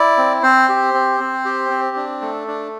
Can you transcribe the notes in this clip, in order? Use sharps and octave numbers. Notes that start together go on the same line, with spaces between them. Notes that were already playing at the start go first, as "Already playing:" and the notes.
Already playing: E4 D5
C4
C4 C5
G4
C4
C4
G4
C4
D4
A3
D4